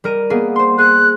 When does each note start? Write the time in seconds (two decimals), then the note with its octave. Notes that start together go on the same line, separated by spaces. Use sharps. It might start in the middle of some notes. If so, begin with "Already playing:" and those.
0.04 G3 A#4 D#7
0.30 A#3 B3 G#4
0.56 C5 C6
0.78 G#4 F#6